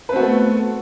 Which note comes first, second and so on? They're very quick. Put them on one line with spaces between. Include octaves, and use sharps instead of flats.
B4 C4 F#4 B3 A3